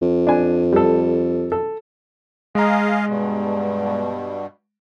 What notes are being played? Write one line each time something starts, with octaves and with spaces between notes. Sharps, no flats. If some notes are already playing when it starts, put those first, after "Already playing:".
F2
D4 G#5
G3 A4
A4
G#3 G#4 D#5 F5 A#5
G2 B2